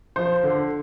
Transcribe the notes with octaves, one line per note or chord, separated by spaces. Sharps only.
F3 C5
D3